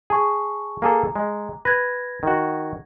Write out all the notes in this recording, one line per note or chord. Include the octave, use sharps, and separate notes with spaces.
G#4 A5 C#6
A#3 G#4 A4 A#5 D6
G#3
B4 G#6 A#6
D#3 F#4